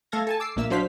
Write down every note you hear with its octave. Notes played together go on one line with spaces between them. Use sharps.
A3 A4 F5 G#6 A#6
A4 G#5 A5
D6 E6 C7
A#1 A#2 A#3 E5 E6
F#3 D4 C5 F5 B6